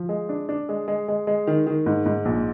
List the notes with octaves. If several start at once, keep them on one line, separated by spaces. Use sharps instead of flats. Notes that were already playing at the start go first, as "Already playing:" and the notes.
Already playing: F3
G#3
D4
D4
G#3
G#3
G#3
G#3
D#3
D#3
G#2
G#2
A#1